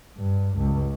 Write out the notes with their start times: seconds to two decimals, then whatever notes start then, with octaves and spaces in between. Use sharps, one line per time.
0.17 G2
0.57 C#2